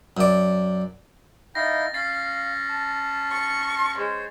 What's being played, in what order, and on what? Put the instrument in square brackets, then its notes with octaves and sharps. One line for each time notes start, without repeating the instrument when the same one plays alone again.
[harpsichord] F#2 D5
[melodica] D#4 E4 F5 [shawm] G5 [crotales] A6 A#6
[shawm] C#4 [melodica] F5 [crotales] A6 C7
[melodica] A5
[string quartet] C#6
[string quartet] G#3 [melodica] C5 C#5